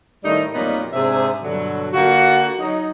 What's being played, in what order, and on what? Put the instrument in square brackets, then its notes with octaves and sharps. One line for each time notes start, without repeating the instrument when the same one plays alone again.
[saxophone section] A2 D#3 G3 A3 D#4
F2 A#2 F#3 G3 B3 D#4
G#2 C3 C4 D4 G#4 E5
G2 B2 D3 F#3
D3 A#3 F4 F#4
F#3 D#4